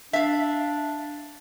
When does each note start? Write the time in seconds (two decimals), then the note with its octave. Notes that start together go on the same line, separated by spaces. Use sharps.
0.13 D4 E5 F5